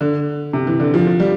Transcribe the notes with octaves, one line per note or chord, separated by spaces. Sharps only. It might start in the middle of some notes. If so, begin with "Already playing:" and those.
D3
C3
E3
D3
F3
F3
G3